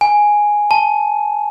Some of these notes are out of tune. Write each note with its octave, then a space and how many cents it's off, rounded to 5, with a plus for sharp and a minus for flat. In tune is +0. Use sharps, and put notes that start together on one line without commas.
G#5 +0
A5 -10